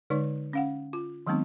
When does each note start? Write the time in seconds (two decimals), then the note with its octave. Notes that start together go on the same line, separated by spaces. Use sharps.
0.10 D3 G#3 D#4 C#5 D5
0.53 C#4 F5 F#5
0.93 F4
1.27 D#3 F#3 G#3 B3 C4 D#4